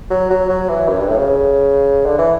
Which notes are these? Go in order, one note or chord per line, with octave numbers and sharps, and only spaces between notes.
F#3
F#3
F#3
E3
F#2
G2
A2
C#3
D3
E3